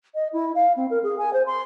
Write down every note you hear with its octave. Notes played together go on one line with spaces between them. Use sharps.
D#5
E4
F5
C4
A#4
G#4
G#5
C5
C6